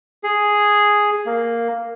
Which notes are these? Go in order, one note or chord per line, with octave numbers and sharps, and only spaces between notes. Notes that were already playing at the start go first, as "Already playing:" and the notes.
G#4
A#3